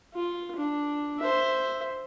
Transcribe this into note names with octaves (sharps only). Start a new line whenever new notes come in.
F4
D4
C5 E5